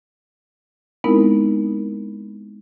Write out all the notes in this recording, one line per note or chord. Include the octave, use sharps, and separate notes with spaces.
G#3 B3 C4 D#4 E4 A#4